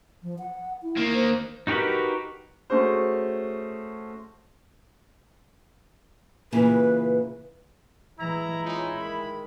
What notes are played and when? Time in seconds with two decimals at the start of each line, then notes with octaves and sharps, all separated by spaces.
0.23 F3
0.39 F#5
0.82 E4
0.97 D#3 A#3
1.13 C5
1.67 D#4 F#4 G4 A#4 B4
2.70 A3 C#4 F#4 G#4 C5
6.53 A#2 C#3 E3 B4
8.19 E3 G#3 E4 A#5
8.64 G#3 C#4 D#4 F4
8.97 D#3 B5